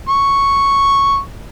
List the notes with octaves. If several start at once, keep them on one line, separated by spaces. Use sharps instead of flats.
C#6